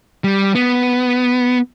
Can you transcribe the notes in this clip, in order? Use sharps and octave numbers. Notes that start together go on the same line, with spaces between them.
G3
B3